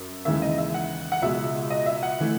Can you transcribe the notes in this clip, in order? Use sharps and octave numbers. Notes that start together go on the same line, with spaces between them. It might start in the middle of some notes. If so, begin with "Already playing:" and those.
Already playing: F#2
D#2 C#3 E3 G#3 E5
D#5
E5
F#5
F#5
C#2 B2 G#3 E5
D#5
E5
F#5
E3 A3